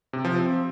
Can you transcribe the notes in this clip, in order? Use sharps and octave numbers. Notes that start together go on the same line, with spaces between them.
C3
F3
C4